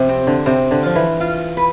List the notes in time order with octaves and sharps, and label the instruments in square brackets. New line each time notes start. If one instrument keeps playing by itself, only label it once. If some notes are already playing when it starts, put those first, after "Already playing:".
Already playing: [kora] C3 [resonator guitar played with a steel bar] F3
[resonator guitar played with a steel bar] C4
[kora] D3
[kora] C3 [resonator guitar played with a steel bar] C4
[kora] D3
[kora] F3 [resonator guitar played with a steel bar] F4
[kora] E3
[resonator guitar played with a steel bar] F4
B4